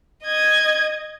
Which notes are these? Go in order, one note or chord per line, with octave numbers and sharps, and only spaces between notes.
D#5 G#6